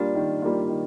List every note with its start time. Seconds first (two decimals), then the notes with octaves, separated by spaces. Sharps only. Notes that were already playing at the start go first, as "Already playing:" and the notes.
Already playing: G3 A#3 D4 F4
0.15 D#3
0.42 G3 A#3 F4
0.69 D#3